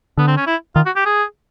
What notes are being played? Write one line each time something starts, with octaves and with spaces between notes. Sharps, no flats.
D3 B3
C4
C#4
E4
D#3 F4
F#4
G4
G#4